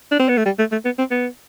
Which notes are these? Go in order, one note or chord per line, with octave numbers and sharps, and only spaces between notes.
D4
C4
B3
A3
G3
A3
A3
B3
C4
B3